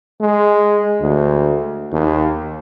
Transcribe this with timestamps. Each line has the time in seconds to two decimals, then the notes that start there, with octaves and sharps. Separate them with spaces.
0.21 G#3
1.01 D2
1.92 D#2